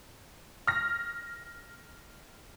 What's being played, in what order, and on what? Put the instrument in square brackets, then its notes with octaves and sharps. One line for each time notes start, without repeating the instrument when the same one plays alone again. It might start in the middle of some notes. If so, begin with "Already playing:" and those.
[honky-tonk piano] F6 A#6